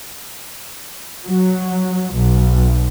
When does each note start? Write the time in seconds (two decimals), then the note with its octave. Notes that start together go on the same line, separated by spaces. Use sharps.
1.24 F#3
2.14 B1